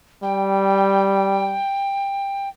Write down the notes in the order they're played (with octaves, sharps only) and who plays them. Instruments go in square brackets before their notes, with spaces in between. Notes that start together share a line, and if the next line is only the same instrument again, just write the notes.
[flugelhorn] G3 [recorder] G5